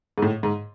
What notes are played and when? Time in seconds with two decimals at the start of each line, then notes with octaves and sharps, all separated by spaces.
0.18 G#2
0.22 A2
0.43 G#2